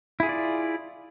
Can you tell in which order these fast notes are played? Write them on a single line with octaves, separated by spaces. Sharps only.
E4 G#4 F4 D5